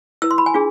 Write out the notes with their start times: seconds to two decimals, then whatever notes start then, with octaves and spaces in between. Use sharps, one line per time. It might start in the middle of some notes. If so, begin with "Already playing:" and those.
0.22 E4 B4 E6
0.31 C6
0.38 B5
0.46 G#5
0.54 D4 F4 G#4